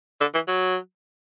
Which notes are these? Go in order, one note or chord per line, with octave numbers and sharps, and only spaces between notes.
D3
E3
F#3